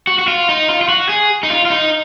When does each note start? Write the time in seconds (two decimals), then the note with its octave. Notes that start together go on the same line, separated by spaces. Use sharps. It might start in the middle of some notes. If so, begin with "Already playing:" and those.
0.07 F#4
0.19 F#4
0.28 F4
0.49 D#4
0.69 F4
0.81 F4
0.89 F#4
1.09 G#4
1.43 D#4
1.50 F4
1.65 F4
1.70 D#4